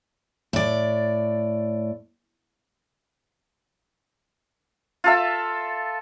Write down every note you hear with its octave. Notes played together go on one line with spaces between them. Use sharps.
A2 D5
F4 A4 E5